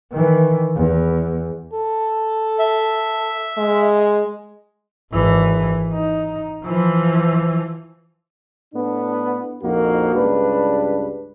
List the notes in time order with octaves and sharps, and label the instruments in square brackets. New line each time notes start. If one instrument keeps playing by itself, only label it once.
[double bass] D#3 E3
E2
[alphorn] A4
[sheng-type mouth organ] E5
[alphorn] G#3
[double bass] G#1 E3
D#4
E3 F3
[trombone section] A2 B3 D4
A#1 F2 A#3 D#4 F#4
C#2 G2 D4 B4